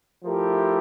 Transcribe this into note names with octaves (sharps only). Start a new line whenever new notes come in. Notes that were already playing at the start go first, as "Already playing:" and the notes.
F3 A3 E4 G4 A#4